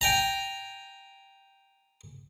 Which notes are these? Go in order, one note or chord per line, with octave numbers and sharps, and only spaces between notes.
G5 G#5 A#5